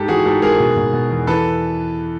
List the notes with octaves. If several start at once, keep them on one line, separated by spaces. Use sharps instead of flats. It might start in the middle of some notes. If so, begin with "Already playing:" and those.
Already playing: G#2 G4 A4
E3 F#4 G#4
G#2 G4 A4
G#2 G#4 A#4
B2
B2
B2
E2
E3 A4 B4